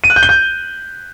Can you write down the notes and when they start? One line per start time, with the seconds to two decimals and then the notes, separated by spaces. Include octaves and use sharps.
0.04 D#7
0.10 F#6
0.16 G6
0.23 G7
0.29 G6